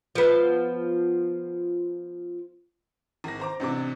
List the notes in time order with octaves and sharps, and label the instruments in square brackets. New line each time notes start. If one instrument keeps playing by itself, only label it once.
[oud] F3 B3
[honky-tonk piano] G#1 A#6
C5 A#5 D6
A1 C3 D4 D6